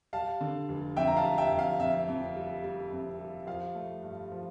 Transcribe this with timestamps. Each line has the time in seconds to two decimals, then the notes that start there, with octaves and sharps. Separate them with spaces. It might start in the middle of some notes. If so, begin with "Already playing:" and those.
0.13 G3 F5 A5
0.41 D3
0.69 F1
0.97 F2 E5 G5
1.07 A#5
1.17 F5 A5
1.24 G3
1.38 E5 G5
1.52 F2
1.59 F5
1.79 F2 E5
2.08 F2
2.36 G3
2.63 G3
2.92 F2
3.19 G3
3.47 F3 F5
3.75 A3
4.03 G2
4.32 F3